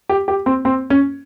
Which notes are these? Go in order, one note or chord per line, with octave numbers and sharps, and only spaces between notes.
G4
G4
C4
C4
C#4